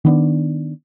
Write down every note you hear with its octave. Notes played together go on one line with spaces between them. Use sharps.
D#3 B3 D4